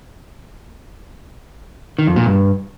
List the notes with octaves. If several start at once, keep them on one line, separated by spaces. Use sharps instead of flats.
D#3
F2
A#2
G2